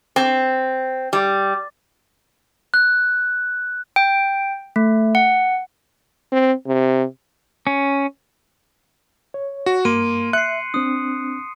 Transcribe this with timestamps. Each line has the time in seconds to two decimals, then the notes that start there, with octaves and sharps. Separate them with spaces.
0.16 C4
1.13 G3
2.74 F#6
3.96 G5
4.76 A3
5.15 F#5
6.32 C4
6.67 C3
7.67 C#4
9.34 C#5
9.66 F#4
9.85 G2 A#3 C6 D7 D#7
10.33 E5 F#6 C7 C#7
10.74 C4 D4 D#6